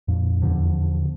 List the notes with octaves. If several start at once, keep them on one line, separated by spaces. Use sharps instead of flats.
F2 A#2
E2 D3 F3